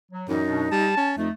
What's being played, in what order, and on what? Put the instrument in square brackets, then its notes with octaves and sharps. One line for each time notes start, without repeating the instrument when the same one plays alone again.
[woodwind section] F#3
[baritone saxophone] F#2 [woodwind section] A2 E3 G3 [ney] D#4
[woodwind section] B2 D4
[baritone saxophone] G3 [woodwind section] A5
[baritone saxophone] C#4
[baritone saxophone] F2 [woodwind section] A3 [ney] D#4